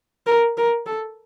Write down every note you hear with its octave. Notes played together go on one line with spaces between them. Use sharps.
A#4
A#4
A4